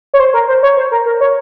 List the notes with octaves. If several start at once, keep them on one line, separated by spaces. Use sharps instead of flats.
C#5
C5
A#4
C5
C#5
C5
A#4
A#4
C#5